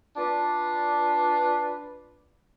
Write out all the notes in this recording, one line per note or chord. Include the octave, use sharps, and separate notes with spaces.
D4 F4 B4 D5